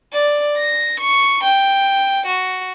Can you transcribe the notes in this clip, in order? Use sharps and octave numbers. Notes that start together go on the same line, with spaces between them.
D5
A#6
C#6
G5
F#4